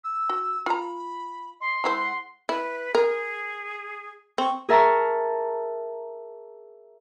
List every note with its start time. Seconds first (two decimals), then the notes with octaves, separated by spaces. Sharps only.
0.04 E6
0.29 F#4
0.66 F4 A#5 B5
1.60 D#5 C6
1.84 G#3 E4 C5 F#5
2.49 E4 B4
2.95 G#4 A#4
4.38 C4 C#6
4.69 G#4 A#4 E5 A5 A#5 C#6